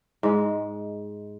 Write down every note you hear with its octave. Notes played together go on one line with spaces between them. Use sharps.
G#2 G#3